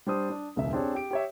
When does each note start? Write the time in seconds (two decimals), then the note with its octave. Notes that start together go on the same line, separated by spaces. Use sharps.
0.07 G3 D4 C5 D#6
0.30 D4
0.56 E1 C#2 C#3 E5
0.73 C4 D4 G4 G#4 C#5
0.95 G4 D7
1.11 G4 C#5 E5